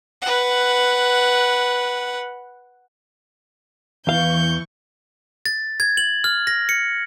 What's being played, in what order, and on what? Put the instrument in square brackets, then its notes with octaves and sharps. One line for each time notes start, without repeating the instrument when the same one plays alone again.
[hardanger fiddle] B4 F#5
[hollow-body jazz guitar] E2 F5 [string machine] E3 C#6 [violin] G6
[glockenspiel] A6
G#6
F#7
F6
A#6
C#7